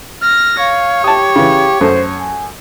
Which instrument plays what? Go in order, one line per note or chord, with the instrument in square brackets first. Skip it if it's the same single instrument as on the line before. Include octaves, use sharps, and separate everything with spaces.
[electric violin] F6 A#6
[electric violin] C#5 [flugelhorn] F5
[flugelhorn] G4 [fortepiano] A5 D#6
[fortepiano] C#3 E3
[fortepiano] F#2 A3 [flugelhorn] C5
[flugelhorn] G#5